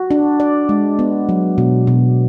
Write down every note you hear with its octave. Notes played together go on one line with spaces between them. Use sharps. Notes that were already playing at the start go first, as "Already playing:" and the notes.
Already playing: F#4
D4
D5
G#3
B3
F#3
B2
B2